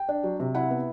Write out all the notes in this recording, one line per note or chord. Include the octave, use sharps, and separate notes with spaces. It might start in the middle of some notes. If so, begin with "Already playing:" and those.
Already playing: G5
D4
F#3
C3
E4 F#5
B3